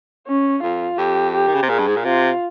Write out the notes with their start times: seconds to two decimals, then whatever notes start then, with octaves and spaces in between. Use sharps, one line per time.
0.27 C#4
0.63 F2 F4
0.98 F2 G4
1.34 G4
1.48 D#3
1.55 C#3
1.63 C3
1.70 A#2 G#4
1.79 G2
1.88 G#2
1.97 A#2
2.05 C3 F4